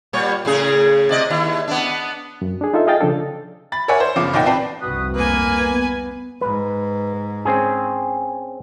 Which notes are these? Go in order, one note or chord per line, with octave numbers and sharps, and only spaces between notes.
A#2 G3 C#5
A2 C#3 G#4
C3 D5 D#5
D#2 E4
B3 D4
F#2
D4 G#4
D#4 F4 A4 E5
G#4 D#5 F5 G5 A6
C#3 F3 D4 A4
B5 A6
A#4 C#5 D5 E5 F#5 G#5
C5
F#1 C#3 F3 B3 F5 D6
B1 A#2 D#4 F#5 G5
C4 B4 D5 G5 A5 C7
F1 C2 G2 F#4 B4 D#6
A#3 B4 G#5
B3
G#2 B4
C4 C#4 G#4